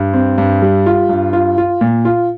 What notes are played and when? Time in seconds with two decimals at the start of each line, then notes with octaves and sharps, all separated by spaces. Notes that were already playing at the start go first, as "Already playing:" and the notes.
Already playing: G2
0.14 C4
0.38 G2
0.62 G3
0.86 F4
1.09 G2
1.33 F4
1.58 F4
1.81 A#2
2.05 F4